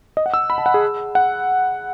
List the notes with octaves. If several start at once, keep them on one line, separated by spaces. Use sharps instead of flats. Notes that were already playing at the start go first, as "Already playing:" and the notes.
D#5
F#5
E6
B5
A5
F#5
G#4
F#5